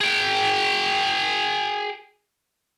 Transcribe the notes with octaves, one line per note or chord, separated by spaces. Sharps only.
G#4 G5